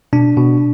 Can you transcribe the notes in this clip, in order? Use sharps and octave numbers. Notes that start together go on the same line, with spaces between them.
B2 D4
B2